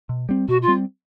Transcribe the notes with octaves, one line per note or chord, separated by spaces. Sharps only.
B2
G3 C4
B2 F#4
F4
G3 C4